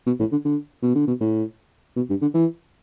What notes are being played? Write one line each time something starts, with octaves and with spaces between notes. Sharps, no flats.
B2
A2
D3
D3
B2
D3
B2
A2
B2
G2
D3
E3